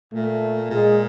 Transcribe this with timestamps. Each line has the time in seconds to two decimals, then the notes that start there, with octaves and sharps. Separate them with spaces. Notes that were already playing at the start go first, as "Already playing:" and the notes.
0.13 A#2 A3
0.70 A#2 G#3